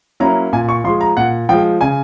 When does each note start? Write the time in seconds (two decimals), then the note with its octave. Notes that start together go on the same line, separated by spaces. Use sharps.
0.20 F#3 A#3 C#4 E4 A#5
0.53 A#2 G#5
0.69 C#6
0.84 F3 C6
0.88 G#3
1.01 A#5
1.17 A#2 F#5
1.49 F3 G#3 G5
1.81 C#3 G#5